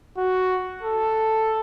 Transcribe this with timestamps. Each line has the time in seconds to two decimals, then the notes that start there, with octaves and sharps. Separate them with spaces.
0.18 F#4
0.83 A4